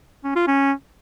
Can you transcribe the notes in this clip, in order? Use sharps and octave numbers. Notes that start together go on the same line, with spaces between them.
C#4
F4
C#4